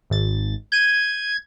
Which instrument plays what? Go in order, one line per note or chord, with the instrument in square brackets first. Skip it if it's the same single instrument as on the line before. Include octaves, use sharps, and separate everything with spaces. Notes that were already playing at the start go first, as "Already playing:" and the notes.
[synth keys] G#1 A6
[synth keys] G6 D#7 [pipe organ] G#6